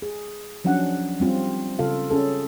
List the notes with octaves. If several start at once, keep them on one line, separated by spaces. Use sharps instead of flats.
G#4
F3 F#3 C#4 D4 F#5
G3 C4 F4
C#3 F4 A4 F5
C#4 G#4 A4